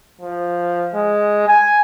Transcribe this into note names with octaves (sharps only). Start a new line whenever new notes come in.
F3
G#3
G#5